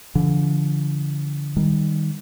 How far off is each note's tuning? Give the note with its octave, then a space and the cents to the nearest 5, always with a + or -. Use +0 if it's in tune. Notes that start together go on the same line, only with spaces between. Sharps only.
D3 -30 F3 -40
D#3 +0 G3 +20